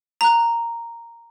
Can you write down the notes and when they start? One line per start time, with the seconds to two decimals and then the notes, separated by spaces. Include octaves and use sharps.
0.21 A#5 F#6